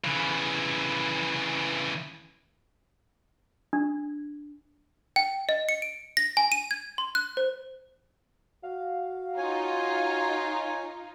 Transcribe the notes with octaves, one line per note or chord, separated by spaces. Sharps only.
C#3 E3
D4
G5
D#5
C#7
D7
A#6
G#5
D#7
G#6
C6
F#6
C5
F#4 F5
D#4 F4 C#5 G#5